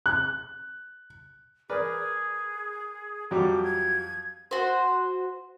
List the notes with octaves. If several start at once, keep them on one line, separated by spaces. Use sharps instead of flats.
F#6
G#4 A#4 B4 D5
F2 F#3 G3 D6
G#6
F#4 C5